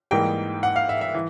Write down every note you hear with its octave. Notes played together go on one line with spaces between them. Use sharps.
G#2 E3 G3 A#3 D#4 G5
F#5
F5
E5
E5
E3